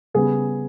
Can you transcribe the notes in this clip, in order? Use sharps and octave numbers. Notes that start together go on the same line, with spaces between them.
C#3 G3 B3 G#4